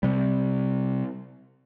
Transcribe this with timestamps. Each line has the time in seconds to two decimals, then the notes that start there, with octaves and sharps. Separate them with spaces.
0.03 C3 G3